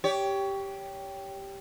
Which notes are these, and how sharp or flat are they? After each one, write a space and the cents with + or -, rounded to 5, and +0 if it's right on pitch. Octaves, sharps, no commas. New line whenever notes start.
G4 +0 C#5 +20